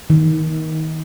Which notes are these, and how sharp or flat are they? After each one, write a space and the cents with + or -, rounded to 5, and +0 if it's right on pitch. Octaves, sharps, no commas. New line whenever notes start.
D#3 +25